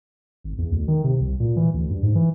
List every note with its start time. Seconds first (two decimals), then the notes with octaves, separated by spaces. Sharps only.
0.44 G#1
0.58 E2
0.72 D2
0.88 D#3
1.04 C3
1.20 C2
1.40 A#2
1.56 E3
1.74 D2
1.90 G2
2.03 G#2
2.15 E3